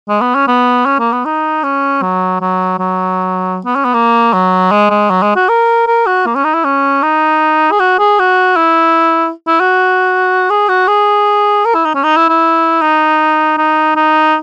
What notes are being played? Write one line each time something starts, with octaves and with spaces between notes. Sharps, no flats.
G#3
B3
C#4
B3
C#4
A#3
B3
D#4
C#4
F#3
F#3
F#3
B3
C#4
B3
A#3
F#3
G#3
G#3
F#3
G#3
F#4
A#4
A#4
F#4
A#3
C#4
D#4
E4
C#4
D#4
G#4
F#4
G#4
F#4
E4
E4
F#4
G#4
F#4
G#4
A#4
E4
D#4
C#4
D#4
E4
E4
D#4
D#4
D#4